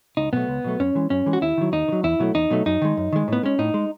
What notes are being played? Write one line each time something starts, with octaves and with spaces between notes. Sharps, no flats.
C#2 D#4
B2 F#3 A3 B3
C#2
B2 F#3 A3
F#2 C#4
E3 G#3
F#2 C#4
E3 G#3
F#4
D#2 E4
D#3 F#3
D#2 D#4
D#3
F#3
E2 E4
B2 F#3 A3
E2 D#4
B2 F#3 A3
F#2 D#4
D#3 G#3
F#2
D#3 G#3
A2 B3
G#3 C#4
A2 D#4
G#3